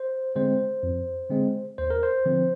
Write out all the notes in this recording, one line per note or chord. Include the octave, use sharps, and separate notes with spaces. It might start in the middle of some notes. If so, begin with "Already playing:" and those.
Already playing: C5
D3 G#3 C4 C5
F2
D3 G#3 C4
D#2 C5
A#4
C5
D3 F3 C4